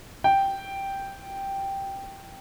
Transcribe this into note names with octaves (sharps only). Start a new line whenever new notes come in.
G5